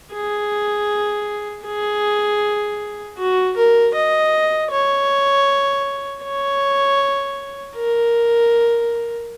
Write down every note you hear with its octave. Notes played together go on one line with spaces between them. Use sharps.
G#4
G#4
F#4
A#4
D#5
C#5
C#5
A#4